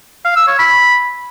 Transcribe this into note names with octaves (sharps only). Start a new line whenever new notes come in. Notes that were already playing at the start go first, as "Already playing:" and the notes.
F5
E6
C#5
B5